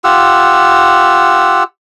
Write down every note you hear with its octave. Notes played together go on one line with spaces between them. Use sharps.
F4 G4 F#5 E6